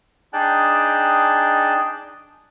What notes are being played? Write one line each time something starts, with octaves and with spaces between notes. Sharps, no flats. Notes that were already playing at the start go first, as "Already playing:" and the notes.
D4 D#4 G#4 G5 A5 F#6